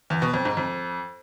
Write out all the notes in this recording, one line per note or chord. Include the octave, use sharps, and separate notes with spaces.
E2
B2
F2
G#2
F2